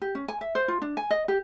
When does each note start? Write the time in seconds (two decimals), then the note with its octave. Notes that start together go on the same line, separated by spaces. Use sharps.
0.02 G4
0.15 C#4
0.28 G#5
0.41 E5
0.55 C5
0.68 F4
0.82 D4
0.97 G#5
1.11 D#5
1.28 G4